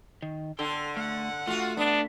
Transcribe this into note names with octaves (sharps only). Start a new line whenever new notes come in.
D#3
D3 A4 G5 C6
A3 F#5
A3 F4 F#4
B3 D4